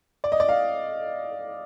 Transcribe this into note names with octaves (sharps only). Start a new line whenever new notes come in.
D5
D#5
D5
F5